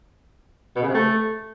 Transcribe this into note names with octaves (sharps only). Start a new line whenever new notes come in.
B2
C#3
C3
A3